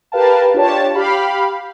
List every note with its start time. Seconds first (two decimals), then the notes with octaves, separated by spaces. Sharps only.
0.12 G4 A#4 B4 F5 G5 A5
0.54 D4 F4 G4 C#5 A5
0.95 G4 F5 B5